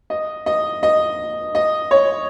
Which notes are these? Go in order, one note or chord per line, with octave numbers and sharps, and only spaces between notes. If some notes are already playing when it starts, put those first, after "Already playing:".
D#5
D#5
D#5
D#5
C#5